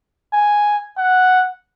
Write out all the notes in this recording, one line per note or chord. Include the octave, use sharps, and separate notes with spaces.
G#5
F#5